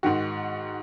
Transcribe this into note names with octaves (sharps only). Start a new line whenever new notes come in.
G#2 D#3 F#4